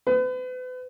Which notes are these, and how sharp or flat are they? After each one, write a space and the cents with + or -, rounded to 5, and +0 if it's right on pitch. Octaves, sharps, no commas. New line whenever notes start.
B4 +40